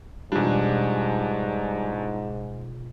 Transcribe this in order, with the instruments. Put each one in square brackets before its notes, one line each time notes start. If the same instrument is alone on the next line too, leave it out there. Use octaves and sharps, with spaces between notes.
[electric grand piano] E2 D4 [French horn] G#2 [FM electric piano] B2 F4 [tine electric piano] G3